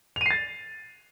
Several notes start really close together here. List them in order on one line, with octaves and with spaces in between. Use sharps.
F7 D#7 C7 A6